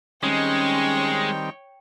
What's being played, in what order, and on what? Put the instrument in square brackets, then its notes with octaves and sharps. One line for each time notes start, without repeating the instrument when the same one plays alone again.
[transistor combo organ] D#3 G3 C4 [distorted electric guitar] G#3 [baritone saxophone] C#4 [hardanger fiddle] C#5 G5